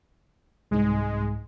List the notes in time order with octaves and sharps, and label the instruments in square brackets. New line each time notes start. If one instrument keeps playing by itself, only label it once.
[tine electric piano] C2 G#2 [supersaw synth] G#3